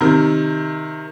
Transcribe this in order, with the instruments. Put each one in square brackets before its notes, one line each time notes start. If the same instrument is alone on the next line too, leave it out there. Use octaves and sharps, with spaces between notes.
[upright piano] C3 D#3